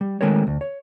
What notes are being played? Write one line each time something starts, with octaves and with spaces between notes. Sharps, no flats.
G3
D#3 G#3 A3 C4 A#4 C#5
D2
C#5